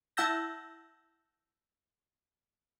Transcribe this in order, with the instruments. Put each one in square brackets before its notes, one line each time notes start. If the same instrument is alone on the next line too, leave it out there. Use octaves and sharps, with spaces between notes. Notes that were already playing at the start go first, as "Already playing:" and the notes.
[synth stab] E4 F#5 A5 E6 G6 A#6